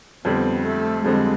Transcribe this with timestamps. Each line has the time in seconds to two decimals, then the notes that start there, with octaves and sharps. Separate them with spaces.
0.25 F2 D3 G3 B3 C4
0.64 A3
1.04 F2 D3 G3 G#3 C4